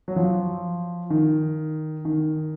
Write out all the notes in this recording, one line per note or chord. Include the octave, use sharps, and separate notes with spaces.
F#3
F3
D#3
D#3